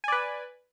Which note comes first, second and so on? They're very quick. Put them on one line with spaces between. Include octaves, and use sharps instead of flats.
G#5 D5 B4